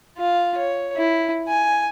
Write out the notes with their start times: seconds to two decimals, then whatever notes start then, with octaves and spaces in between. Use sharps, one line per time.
0.18 F4 F5
0.58 C#5
0.97 E4
1.49 G#5